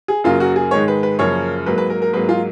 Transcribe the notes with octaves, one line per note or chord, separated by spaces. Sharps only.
G#4
F#2 C#3 F#3 A#3 F4
F#4
G#4
G#2 D#3 G#3 C#5
B4
B4
F#2 C#3 F3 A#3 C#5
G#2 F#3 A#3 B4
B4
A#4
A#4
G#2 F#3 A#3 B4
F4